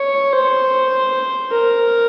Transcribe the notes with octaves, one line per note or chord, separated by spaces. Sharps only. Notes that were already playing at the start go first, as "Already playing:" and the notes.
Already playing: C#5
C5
A#4